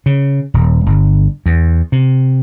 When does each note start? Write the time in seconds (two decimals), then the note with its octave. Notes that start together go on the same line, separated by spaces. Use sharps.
0.06 C#3
0.54 D#1
0.86 G1
1.46 E2
1.92 C3